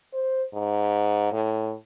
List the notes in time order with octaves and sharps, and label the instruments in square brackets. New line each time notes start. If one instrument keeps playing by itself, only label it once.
[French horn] C5
G#2
A2